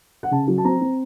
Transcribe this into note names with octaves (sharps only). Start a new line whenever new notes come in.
F#5
C#3 A5
F#3
A5
C4 A#5
C4